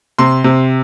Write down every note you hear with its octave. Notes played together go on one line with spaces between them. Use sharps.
C3 C6
C3